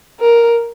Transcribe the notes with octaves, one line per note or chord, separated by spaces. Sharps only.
A#4